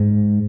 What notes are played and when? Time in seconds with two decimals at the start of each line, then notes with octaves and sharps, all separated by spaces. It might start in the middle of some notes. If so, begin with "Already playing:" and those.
Already playing: G#2